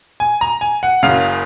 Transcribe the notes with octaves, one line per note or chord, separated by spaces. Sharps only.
G#5
A#5
G#5
F#5
F#1 F#2 C#3 F5